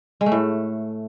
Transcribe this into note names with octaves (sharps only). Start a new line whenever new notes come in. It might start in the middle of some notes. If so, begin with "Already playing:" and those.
G#3
A3
A2